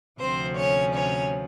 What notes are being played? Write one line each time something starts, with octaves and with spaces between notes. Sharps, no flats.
D2 C3 F3 C4 C5
C#4 C#5
C#4 C#5